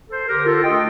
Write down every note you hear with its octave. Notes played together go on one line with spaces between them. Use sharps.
A4 C5
D3 G4 A#4
F4 A4
A3 D4 F4 D#5 G5